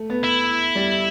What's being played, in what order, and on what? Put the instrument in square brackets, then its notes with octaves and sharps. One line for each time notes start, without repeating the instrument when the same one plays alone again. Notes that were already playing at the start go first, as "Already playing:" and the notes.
Already playing: [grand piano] A3
B3
[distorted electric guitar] E4
[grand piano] G3